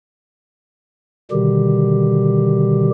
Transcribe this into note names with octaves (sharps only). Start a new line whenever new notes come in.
B2 D3 D#3 G3 G4